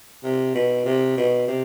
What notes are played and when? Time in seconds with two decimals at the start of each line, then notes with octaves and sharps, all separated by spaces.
0.23 C3
0.54 B2
0.86 C3
1.17 B2
1.48 C3